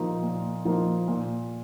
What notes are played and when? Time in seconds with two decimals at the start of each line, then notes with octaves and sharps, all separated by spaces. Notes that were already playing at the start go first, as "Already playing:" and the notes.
Already playing: A#2 F3 A#3 D#4
0.23 A#2
0.65 F3 A#3 D#4
1.08 A#2